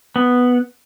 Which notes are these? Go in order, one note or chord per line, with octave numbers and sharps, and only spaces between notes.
B3